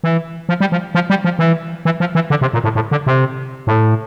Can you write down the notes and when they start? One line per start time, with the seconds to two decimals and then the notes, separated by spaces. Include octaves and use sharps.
0.04 E3
0.49 F3
0.60 G3
0.72 F3
0.95 F3
1.10 G3
1.24 F3
1.39 E3
1.85 E3
2.00 F3
2.15 E3
2.30 D3
2.41 C3
2.54 A#2
2.64 A2
2.75 A2
2.91 D3
3.07 C3
3.67 A2